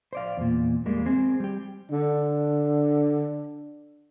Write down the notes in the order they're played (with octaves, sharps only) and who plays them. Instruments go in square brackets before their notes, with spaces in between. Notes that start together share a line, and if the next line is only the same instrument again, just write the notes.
[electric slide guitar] C5 D5 F5
E2 A#2
E2 G3 G#3 A#3
C4 G#4
G3 G4
[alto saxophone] D3 [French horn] D4